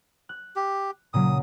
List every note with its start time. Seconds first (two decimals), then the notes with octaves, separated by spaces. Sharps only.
0.29 F#6
0.56 G4
1.14 A#2 C#3 F#3 D#6